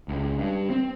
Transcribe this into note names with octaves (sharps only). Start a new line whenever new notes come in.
C#2
G2
C4